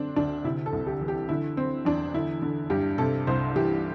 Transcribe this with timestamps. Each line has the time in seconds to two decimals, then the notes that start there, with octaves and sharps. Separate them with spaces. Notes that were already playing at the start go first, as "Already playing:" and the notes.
Already playing: D3 C4 D4
0.16 D2 D4
0.44 C3 E4
0.66 A4
0.73 C2
0.87 G4
1.01 E3
1.08 G4
1.29 D3 E4
1.57 D3 C4
1.85 E2 D4
2.14 D3 E4
2.42 D3
2.70 G2 G4
2.98 C3 A4
3.27 C2 C5
3.55 E3 G4